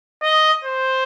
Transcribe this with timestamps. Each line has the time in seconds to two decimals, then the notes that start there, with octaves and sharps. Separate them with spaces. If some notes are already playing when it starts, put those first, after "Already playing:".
0.22 D#5
0.64 C5